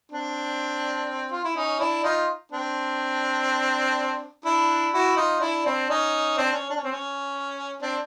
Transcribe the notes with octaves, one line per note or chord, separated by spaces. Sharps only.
C4 D4
F4
E4
C#4 D#4
D4 E4
D#4 F4
C4 D4
D4 E4
E4 F#4
D#4 F4
D4 E4
C4 D4
C#4 D#4
C4 D4
C#4
D4
C#4
C4
C#4
C4 D4